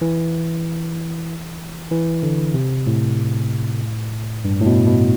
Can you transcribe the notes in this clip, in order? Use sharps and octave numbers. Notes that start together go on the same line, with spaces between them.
E3
E3
D3
C3
A2
G2
A2
B2
B2